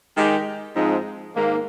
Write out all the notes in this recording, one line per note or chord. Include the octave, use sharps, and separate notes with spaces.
D#3 G#3 D#4 G4
G#2 F3 G#3 C4 D#4
G#2 D#3 A#3